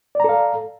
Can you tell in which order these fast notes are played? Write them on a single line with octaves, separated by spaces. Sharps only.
D5 A#5 A4 F5